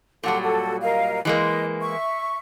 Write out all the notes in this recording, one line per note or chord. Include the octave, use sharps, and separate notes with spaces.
A#2 F#3 G3 A4 F#5 C6
F#4 A4
A#4 D#5 F5
E3 G#3 A#3 D#5
E5 C#6